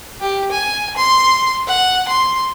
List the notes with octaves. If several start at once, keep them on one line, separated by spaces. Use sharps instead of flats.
G4
G#5
C6
F#5
C6